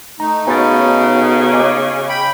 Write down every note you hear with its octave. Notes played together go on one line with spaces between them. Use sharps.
A3 D#4 A#5
C#3 B3 F#4 C#5 G#5 B5 A6
D#5 G#5 D6
G5 B5